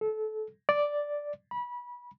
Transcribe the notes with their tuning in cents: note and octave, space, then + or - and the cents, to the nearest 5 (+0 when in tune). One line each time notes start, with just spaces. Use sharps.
A4 -25
D5 +0
B5 -25